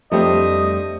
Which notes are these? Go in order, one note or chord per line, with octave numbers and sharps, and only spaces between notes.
F2 G3 A3 D4 C5 D#5